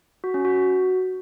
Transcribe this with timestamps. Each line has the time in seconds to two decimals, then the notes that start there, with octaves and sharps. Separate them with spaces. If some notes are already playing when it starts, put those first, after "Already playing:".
0.24 F#4
0.34 C#4
0.45 F#4